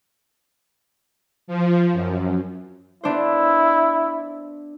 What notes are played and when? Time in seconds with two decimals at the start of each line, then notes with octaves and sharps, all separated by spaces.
1.47 F3
1.93 F#2
3.04 B3 D4 E4 C5